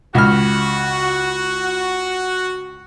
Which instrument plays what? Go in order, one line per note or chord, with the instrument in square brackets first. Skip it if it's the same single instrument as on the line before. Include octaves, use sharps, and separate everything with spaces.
[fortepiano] C#2 F6 [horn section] F#4